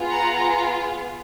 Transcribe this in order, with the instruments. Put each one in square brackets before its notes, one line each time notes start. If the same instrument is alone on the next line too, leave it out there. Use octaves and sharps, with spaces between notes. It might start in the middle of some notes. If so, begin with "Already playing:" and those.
Already playing: [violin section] B3 F4 G#4
F#5 A#5